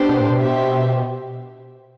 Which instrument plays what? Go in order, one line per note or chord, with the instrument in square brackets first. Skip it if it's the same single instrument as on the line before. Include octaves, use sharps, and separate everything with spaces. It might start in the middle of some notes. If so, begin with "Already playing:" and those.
Already playing: [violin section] B3 D4 G4 C5
[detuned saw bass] B2
A2
B2
[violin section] G4 C5 E5